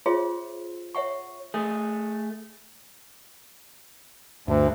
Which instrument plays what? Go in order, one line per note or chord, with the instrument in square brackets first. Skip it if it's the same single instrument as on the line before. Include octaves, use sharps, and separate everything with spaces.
[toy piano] F4 G#4 C5 C#5 E5 C6
C#5 E5 F#5 C#6
[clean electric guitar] A3 G#4
[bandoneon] D2 [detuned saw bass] G2